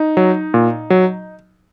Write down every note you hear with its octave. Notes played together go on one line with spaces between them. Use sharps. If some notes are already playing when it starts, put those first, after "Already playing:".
Already playing: D#4
F#3
A#2
F#3